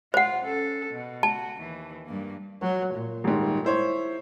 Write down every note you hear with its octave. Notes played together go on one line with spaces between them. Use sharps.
F4 C5 F#5
C#4 A4
B2
F#4 A5
D#2 E3
G2 A#3
F#3
A#2
D#1 G#2
E4 C5 C#5